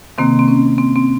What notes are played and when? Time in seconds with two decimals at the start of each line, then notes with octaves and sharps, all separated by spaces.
0.18 C3 D#3 A#3 C4
0.39 C4
0.48 C#4
0.78 C4
0.96 C4